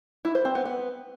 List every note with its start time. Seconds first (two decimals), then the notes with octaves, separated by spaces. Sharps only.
0.25 E4
0.35 C5
0.45 C4
0.55 B3
0.65 B3